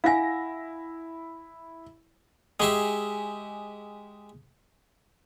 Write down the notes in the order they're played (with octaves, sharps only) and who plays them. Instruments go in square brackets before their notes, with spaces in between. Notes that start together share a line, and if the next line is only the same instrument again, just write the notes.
[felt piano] E4 A#6 [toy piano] F5 F#5 G#5
[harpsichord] G#3 G4 E5 [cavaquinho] G#4